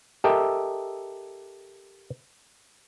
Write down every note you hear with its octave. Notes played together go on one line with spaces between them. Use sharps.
G4 A4 A#4 D#5 E5 G5